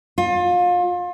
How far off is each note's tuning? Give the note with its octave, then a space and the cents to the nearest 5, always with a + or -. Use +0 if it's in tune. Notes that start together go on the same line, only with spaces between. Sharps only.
F4 +30